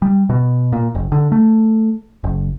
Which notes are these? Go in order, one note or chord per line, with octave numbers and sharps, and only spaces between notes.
G3
B2
A#2
F#1
D3
A3
F#1